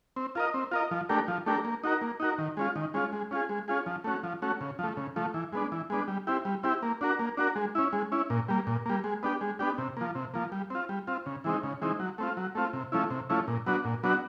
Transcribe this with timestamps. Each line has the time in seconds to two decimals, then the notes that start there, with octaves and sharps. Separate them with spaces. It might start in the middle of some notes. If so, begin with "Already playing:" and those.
0.16 C4
0.35 F4 A#4 D#5
0.54 C4
0.71 F4 A#4 D#5
0.91 F3
1.09 A3 D4 G4 A#4
1.28 F3
1.46 A3 D4 G4 A#4
1.65 A#3
1.84 D#4 F#4 A#4
2.01 A#3
2.20 D#4 F#4 A#4
2.38 D#3
2.57 G#3 C#4 F4
2.76 D#3
2.94 G#3 C#4 F4
3.13 G#3
3.31 C#4 F4 G#4
3.49 G#3
3.68 C#4 F4 G#4
3.86 F3
4.04 A3 C#4 F#4
4.23 F3
4.42 A3 C#4 F#4
4.61 C#3
4.79 F3 A3
4.97 C#3
5.16 F3 A3
5.34 E3
5.53 G#3 B3 D4
5.72 E3
5.90 G#3 B3 D4
6.08 G3
6.27 C4 E4 G4
6.45 G3
6.63 C4 E4 G4
6.82 A#3
7.01 D4 F#4 A#4
7.19 A#3
7.37 D4 F#4 A#4
7.56 G#3
7.75 C#4 E4
7.93 G#3
8.12 C#4 E4
8.30 A#2
8.49 G3 A#3
8.67 A#2
8.86 G3 A#3
9.04 G#3
9.23 B3 D4 G4
9.41 G#3
9.59 B3 D4 G4
9.78 C3
9.97 F3 A#3
10.15 C3
10.34 F3 A#3
10.52 G3
10.70 C4 F4
10.89 G3
11.07 C4 F4
11.26 C#3
11.44 E3 G#3 C4 D#4
11.63 C#3
11.82 E3 G#3 C4 D#4
12.00 F#3
12.18 A3 C4 F4
12.37 F#3
12.55 A3 C4 F4
12.73 C3
12.92 F3 A3 C#4 E4
13.10 C3
13.29 F3 A3 C#4 E4
13.48 A#2
13.66 F#3 B3 D4 F#4
13.85 A#2
14.03 F#3 B3 D4 F#4